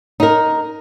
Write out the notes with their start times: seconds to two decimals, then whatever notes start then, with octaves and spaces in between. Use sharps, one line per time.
0.20 D#4 A#4